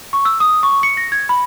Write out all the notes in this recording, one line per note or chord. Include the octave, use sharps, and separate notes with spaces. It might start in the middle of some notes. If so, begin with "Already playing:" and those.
C#6
E6
D#6
C#6
C#7
A#6
G#6
B5